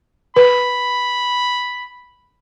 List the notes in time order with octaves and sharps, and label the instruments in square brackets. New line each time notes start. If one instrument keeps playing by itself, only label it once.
[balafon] B4 [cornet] B5